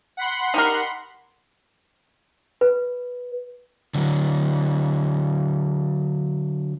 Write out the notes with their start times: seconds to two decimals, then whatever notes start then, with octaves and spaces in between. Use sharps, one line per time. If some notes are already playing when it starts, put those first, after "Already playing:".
0.17 F#5 B5 C6
0.54 D#4 G4 A#4
2.61 B4
3.95 D3 F#3